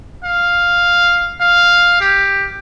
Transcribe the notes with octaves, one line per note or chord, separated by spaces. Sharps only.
F5
F5
G4